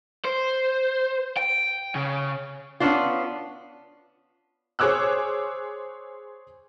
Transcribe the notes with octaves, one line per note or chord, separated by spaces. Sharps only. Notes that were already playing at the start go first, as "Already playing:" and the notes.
C5
G5
C#3
B3 C#4 D4 F4
G#4 C5 C#5 D6 E6 F#6